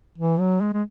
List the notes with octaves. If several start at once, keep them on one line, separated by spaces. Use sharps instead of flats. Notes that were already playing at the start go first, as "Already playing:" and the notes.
E3
F#3
G#3
G#3